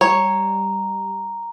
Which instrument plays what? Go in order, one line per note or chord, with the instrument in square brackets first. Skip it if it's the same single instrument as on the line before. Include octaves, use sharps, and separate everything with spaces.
[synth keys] G3 [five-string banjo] C#5 [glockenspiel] A#5